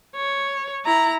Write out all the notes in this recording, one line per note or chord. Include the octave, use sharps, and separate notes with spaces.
C#5
E4 A#5